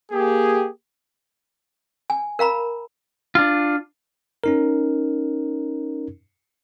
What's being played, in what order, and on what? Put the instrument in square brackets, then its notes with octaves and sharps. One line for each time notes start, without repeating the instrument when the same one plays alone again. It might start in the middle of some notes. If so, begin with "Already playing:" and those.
[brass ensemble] A#3 G4 G#4
[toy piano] G#5
A#4 F5 A#5 B5
[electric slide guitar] D4 F4
[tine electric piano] C#4 D#4 A#4